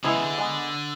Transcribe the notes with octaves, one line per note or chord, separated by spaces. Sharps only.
C#3 G#3 B3 E4 G#4
E3
D3
G#3 B3